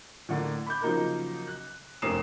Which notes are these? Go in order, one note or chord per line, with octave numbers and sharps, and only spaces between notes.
A2 D3 A#3
B5 D6 G6
C#3 F3 F#3 A#3 D#4 A#4
F#6
F1 A#3 C#4 D#6 C7 E7